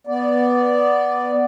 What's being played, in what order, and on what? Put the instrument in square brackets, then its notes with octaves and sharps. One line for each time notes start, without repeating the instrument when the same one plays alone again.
[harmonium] B3 D5